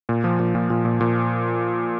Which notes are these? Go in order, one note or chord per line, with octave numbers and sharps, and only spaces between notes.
A#2
F3
A#2
A#2
A#2
A#2
A#2